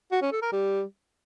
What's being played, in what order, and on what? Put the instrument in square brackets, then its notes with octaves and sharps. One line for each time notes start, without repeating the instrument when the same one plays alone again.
[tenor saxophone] F#4
C#4
A4
A#4
G3